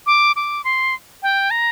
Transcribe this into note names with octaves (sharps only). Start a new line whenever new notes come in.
D6
D6
C6
G5
A#5